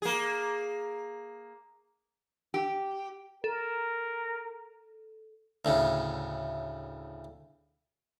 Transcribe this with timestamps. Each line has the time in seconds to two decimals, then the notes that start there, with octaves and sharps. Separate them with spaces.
0.02 A#3 G#4
2.54 G4
3.44 A4 A#4
5.65 D2 A2 C#3